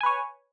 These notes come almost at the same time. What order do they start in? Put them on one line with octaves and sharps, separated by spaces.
G#5 B4 C#5